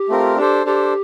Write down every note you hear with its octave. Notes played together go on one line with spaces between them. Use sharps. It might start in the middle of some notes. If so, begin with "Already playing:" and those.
Already playing: G4
A3 C4 F4 A#4
D4 G4 A4 C5
D4 G4 A4 C5